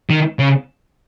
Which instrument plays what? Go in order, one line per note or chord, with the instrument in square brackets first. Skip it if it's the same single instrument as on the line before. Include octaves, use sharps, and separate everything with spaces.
[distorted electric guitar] D#3
C#3